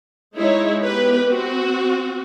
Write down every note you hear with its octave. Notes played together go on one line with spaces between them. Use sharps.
G#3 D#4 E4 C#5
B3 G4 B4
C4 F#4